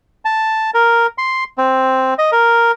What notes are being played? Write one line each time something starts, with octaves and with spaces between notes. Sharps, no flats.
A5
A#4
C6
C4
D#5
A#4